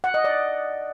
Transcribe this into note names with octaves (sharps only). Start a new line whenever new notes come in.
F#5
D#5
D5